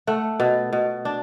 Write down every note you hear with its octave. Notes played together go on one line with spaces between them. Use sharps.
A3 F#5
B2
B2
D4